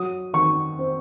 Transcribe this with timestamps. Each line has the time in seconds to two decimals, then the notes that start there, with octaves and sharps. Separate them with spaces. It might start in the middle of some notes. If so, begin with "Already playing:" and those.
Already playing: F#3 D#6
0.34 D#3 C#6
0.79 C4